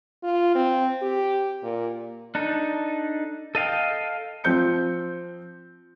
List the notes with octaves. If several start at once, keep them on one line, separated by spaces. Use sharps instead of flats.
F4
C4
G4
A#2
D4 D#4 A4
A4 D#5 F5 G5
F3 C4 G6 C#7